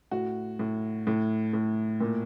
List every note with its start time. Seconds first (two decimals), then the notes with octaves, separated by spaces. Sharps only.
0.11 A2 F#4
0.59 A2
1.07 A2
1.53 A2
2.00 A#2